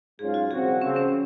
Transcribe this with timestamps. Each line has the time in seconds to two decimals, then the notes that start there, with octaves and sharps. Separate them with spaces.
0.19 G#2 F#3 C#4 F4 G#4
0.34 F#4
0.50 C2 A#2 F3 C4 F#4 G#4
0.81 C#3 F3 C4 C#4
0.96 C#4